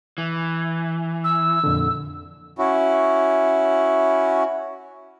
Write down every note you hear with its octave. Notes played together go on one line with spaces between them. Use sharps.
E3
E6
F2 A#2 D3
C#4 E4 F#4